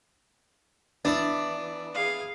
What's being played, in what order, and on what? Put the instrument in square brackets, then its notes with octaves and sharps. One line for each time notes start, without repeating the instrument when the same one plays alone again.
[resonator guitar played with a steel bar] E3 D4 [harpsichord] B3 E4 D5
[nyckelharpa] G#4 F5